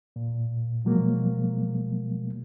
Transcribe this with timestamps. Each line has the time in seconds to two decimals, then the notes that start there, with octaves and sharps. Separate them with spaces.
0.16 A#2
0.85 B2 F3 F#3 G#3 A#3